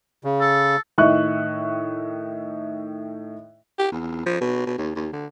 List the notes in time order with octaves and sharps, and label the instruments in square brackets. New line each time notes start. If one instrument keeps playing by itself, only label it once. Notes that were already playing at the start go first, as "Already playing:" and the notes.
[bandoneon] C#3
[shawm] A4
[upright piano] A2 D#3 D#5 E5 C#6 F#6
[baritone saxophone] G4
E2
F3
B2
B2
D#2
D#2
D3